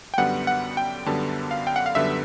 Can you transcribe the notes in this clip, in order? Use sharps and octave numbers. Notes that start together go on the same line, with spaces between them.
G5
F#2 D3 G3 B3 F#5
F#5
G5
F#2 D3 G3 B3 A5
F5
G5
F#5
F5
F#2 D3 G3 B3 E5